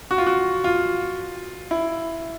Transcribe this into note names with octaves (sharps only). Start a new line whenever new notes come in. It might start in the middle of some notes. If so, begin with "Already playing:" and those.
F#4
F4
F#4
F4
E4